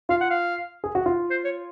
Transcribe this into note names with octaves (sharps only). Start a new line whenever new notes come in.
F4 F5
F#5
F5
G#4
F#4
F4
C5
C#5